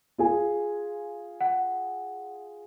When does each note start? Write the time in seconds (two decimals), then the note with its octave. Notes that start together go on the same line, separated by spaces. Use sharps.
0.18 F4 G#4 G#5
1.41 F#5